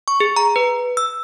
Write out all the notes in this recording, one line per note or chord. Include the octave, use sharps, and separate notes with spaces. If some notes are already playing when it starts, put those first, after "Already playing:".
C#6
G#4
A#5
B4
E6